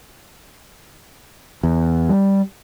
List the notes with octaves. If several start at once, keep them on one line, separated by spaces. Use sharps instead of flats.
E2
G3